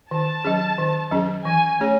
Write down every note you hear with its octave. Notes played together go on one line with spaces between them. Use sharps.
D#3 A5
F#3 C#4 G#4
D#3
F#3 C#4 G#4
E3 G#5
A3 C#4 G#4 C#5